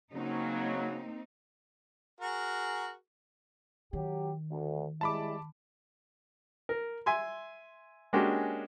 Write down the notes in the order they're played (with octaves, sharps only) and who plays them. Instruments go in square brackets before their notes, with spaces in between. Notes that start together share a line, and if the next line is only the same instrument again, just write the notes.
[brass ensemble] C#3 F#3 [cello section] A#3 C4 D#4
[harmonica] F#4 G#4 A#4
[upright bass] D#3 [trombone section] F#3 G4
[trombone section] D2
[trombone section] G3 G#3 E4 [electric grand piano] A5 B5 D6
[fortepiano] A#4
E5 G#5 C6
G#3 A#3 C#4 D4 F#4 G4